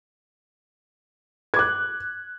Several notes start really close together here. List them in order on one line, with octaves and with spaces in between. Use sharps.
G#6 D6 F#6